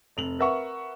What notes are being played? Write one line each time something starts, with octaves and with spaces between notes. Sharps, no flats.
F1 F7 F#7
A#4 B4 E5 F#5 C#6